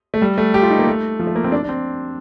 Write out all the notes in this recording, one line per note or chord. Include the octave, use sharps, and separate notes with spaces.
A3
G3
A3
G4
F4
D#4
A#3
A3
F3
A3
A#3
C4
D4
D4
C4